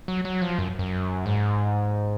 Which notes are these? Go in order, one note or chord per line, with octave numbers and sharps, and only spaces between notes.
F#3
F#3
F3
F#2
F#2
G#2